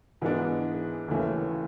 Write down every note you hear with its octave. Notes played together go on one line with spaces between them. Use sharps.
G#2 E3 G#3 B3 D4
D#2 C#3 E3 A3 C#4